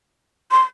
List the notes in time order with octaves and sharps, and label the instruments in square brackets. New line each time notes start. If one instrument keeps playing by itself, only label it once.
[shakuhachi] C6